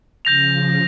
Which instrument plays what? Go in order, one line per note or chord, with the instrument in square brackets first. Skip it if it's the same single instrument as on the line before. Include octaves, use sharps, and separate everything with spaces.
[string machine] C#3 F3 [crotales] G6 A#6 F7